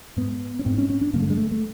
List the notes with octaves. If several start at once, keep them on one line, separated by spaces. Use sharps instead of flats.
G#2 B3
C#4
G#2 C4
C#4
C#4
D4
G2 D3 A#3
A3
G#3
A3
A3